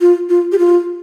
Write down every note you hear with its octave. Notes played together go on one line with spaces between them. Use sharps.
F4
F4
G4
F4